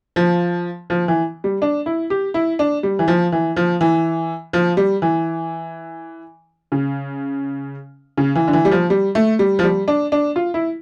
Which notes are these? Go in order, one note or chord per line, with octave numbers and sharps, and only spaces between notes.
F3
F3
E3
G3
D4
E4
G4
E4
D4
G3
E3
F3
E3
F3
E3
F3
G3
E3
C#3
C#3
E3
D3
E3
G3
F3
G3
A3
G3
F3
G3
D4
D4
F4
E4